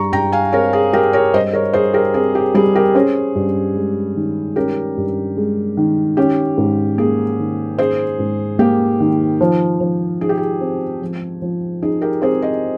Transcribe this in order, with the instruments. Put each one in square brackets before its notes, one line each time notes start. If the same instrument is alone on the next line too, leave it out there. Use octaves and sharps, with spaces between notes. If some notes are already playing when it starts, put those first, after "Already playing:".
Already playing: [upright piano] G2 [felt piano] A#5 C#6
[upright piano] G2 [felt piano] G5 A#5
[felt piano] F5 G#5
[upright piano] C4 [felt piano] A#4 C#5
[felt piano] G#4
[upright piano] G3 [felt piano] G4 A#4
[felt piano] A#4 C#5
[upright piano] G2 [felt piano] C5 D#5
[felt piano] A#4 C#5
[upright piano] G2 [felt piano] G#4 C5
[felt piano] G4 A#4
[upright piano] C4 [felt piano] G#4
[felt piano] G4
[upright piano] G3 [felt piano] G#4
[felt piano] G4 A#4
[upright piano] C#4 [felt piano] G#4 C5
[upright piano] G2
G#3
D#3
[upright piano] C#4 [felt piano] G4 A#4
[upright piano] G2
G#3
D#3
[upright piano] C#4 [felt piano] G4
[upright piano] G#2
[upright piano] A#3 [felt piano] G#4
[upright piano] D#3
[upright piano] C#4 [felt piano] G#4 C5
[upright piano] G#2
[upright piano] A#3 [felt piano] G4
[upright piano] D#3
F3
F3
[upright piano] D#4 [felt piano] G#4
[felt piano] G4
G#4
[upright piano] C4
F3
F3
[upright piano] D#4 [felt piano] G#4
[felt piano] G4 A#4
[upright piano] C4 [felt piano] G#4 C5
[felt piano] C5 D#5